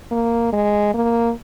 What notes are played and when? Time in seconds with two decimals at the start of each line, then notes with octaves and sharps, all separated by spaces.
0.11 A#3
0.53 G#3
0.94 A#3